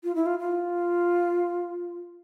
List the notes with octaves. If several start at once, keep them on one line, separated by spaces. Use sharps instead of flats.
F4
E4
F4
F4